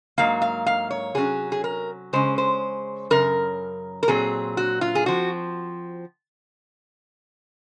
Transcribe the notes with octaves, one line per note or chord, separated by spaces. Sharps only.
G#2 F#3 A#3 F5
F5
F5
C#5
C3 F#3 C#4 G#4
G#4
A#4
C#3 G#3 C#4 C5
C5
F#2 C#3 A#4
A#4
A#2 F#3 C4 G#4
F#4
F4
G#4
F3 C4 F#4